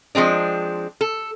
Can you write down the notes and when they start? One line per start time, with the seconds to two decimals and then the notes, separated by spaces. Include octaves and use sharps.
0.15 F3 G#3 C4 D4
1.01 A4